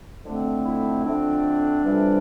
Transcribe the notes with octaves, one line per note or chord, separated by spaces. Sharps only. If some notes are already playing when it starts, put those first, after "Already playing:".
F2 D3 A3 C4
E4
F2 D3 A3 C4 D4
F2 C3 E3 G3